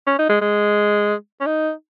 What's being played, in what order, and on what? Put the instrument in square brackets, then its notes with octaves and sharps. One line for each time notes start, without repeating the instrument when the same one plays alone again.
[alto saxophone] C#4
D#4
G#3
G#3
C#4
D#4